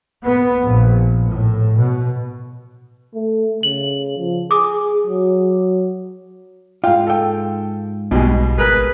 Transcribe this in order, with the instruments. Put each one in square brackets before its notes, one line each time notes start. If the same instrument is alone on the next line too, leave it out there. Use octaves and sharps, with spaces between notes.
[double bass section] B3
A#1
A2
B2
[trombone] A3
[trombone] C#3 [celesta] F#7
[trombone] F3
[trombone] G#4 [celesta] D6 D#6
[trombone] F#3
[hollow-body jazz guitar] G#2 F4 [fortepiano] F5 G5
[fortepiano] A4 G5
[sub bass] B1 [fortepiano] B2 G3 G#3
[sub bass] G#1 [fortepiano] G#4 A#4 [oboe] B4